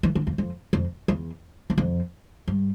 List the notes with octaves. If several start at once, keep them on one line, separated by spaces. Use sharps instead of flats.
E3
D3
E2
F2
F2
E2
E2
F2
G2